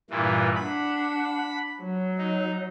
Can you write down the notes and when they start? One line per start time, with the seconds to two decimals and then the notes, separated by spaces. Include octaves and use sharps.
0.10 G2 A#2 E3
0.55 D4 F#5 B5
1.82 F#3
2.18 D#4